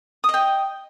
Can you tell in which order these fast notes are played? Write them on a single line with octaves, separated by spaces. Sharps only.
D#6 D#5 G5